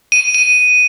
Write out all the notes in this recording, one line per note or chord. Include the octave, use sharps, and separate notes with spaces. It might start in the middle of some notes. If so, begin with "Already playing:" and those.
D#7
D#7